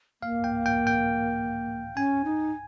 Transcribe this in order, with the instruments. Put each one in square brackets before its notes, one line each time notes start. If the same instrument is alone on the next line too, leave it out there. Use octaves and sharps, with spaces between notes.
[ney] A#3 [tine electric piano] F5
[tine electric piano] G5
G5
G5
[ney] C#4 [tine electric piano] G#5
[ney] D#4